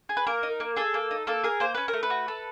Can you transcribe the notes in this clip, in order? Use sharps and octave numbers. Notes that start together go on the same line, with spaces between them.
G#4
B4
A#3 A#4
D#4
A#3
G#4 A4
A#3
D#4
A#3 A4
G#4 A#4
A#3 C5
C#4 B4
A#4
A3
B4
F#4
A4